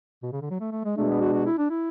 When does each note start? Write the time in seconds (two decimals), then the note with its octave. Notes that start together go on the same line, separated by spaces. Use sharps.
0.23 B2
0.32 C#3
0.41 D3
0.50 F#3
0.60 A3
0.71 A3
0.85 G#3
0.96 B2 G#3 A3 D4
1.09 B3
1.21 F#4
1.33 F#4
1.46 E4
1.58 D4
1.70 E4